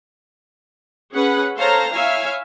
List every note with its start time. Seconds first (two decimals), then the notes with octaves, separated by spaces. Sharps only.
1.14 C#4 G#4 B4 F#5 B5
1.57 A4 C5 C#5 F5 A5 A#5
1.94 E4 C#5 E5 F5 G#5